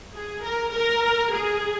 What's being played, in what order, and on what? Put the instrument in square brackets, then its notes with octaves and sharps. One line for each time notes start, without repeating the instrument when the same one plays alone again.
[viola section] G#4
A#4
A#4
G#4